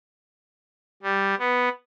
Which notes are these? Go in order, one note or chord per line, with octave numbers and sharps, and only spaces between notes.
G3
B3